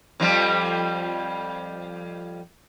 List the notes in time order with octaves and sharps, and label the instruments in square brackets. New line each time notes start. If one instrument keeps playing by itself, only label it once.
[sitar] F2 F3 G3